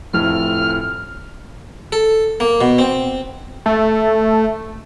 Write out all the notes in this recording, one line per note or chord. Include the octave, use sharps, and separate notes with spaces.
F1 A2 F3 F6
A4
A#3
B2
C4
A3